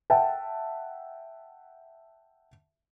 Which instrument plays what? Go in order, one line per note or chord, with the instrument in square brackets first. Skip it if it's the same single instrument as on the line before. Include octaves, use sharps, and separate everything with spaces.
[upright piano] E5 F#5 G5 A5